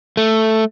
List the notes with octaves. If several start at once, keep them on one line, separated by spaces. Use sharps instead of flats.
A3